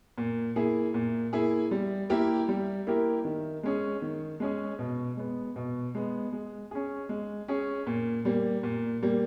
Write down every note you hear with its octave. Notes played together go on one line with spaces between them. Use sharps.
A#2
A#3 E4 G#4
A#2
A#3 E4 G#4
G3
A#3 E4 G4 A#4
G3
A#3 E4 G4 A#4
D#3
G#3 C#4 G#4
D#3
G#3 C#4 G#4
B2
G#3 B3
B2
G#3 B3
G#3
C#4 G#4
G#3
C#4 G#4
A#2
G3 A#3
A#2
G3 A#3